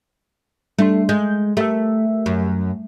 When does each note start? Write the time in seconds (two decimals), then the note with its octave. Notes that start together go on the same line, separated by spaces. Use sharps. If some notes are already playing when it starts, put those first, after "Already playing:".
0.79 G3 A3 D4 C6
1.09 G#3 G6
1.57 A3 G4 A#4 E5
2.26 F#2